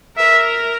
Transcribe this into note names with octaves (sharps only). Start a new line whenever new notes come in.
A#4 E5